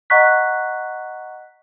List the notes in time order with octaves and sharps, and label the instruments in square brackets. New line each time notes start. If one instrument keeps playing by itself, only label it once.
[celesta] D#5 F#5 A#5 C#6 F#6 B6